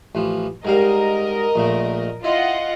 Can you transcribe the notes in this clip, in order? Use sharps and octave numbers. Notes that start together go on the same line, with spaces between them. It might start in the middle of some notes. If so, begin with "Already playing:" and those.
A1 E3 F3
G#2 G3 A#4 D#5 F5
A#1 A#2 A3
E4 F4 D#5 F#5